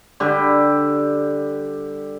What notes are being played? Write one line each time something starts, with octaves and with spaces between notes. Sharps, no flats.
D3 G3 G4